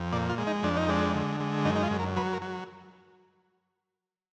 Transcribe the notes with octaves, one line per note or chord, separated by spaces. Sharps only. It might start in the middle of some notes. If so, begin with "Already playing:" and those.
Already playing: F2
A#2 D5
F4
G#3
D#4
F2 D4
D#4
G#3 D4
D3
G#3
F#2 D#4
D#4
F4
F#2
A#4
F#3 B4
A#4
F#3